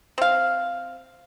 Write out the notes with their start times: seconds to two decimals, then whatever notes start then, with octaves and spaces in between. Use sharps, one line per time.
0.18 C4 F5